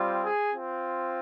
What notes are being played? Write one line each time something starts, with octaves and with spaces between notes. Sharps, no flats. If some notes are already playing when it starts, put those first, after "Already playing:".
Already playing: G3 C4 F4
G#4
C4 F4